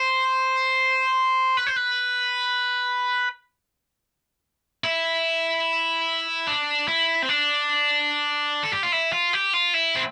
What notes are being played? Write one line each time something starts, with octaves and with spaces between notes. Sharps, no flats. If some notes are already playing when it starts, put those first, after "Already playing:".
Already playing: C5
B4
C5
B4
E4
D4
E4
C4
D4
A4
G4
F4
E4
F4
G4
F4
E4
C4